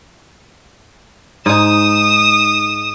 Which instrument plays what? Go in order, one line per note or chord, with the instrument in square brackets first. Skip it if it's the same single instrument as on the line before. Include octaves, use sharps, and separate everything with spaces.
[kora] G#2 D#4 [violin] D#6 E7